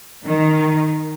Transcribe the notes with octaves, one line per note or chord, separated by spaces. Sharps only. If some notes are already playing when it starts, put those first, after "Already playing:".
D#3